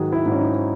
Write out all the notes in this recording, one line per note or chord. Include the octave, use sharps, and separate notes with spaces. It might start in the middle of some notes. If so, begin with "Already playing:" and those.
Already playing: G#2 D#3 F#3 F#4 G#4
E4
G#2
C#4
D#4